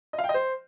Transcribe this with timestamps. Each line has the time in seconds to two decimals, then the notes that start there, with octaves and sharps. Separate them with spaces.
0.13 D#5
0.19 F5
0.24 G5
0.29 D#5
0.34 C5